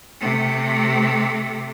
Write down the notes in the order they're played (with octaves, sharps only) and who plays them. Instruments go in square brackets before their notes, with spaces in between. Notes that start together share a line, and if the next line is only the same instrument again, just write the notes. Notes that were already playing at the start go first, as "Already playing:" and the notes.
[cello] C3 A3